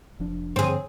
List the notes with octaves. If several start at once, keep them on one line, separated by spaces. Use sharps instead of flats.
F1 F3 D4
G2 D3 F3 C4 G#4